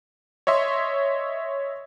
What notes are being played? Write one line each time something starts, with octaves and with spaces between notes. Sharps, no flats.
C#5 D#5 E5 C6